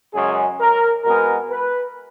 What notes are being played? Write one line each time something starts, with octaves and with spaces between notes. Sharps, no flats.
F#2 C#3 G#3 G#4
A#4
B2 G#3 B3 A#4
B4